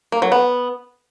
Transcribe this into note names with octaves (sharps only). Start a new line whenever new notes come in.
A#3
F#3
B3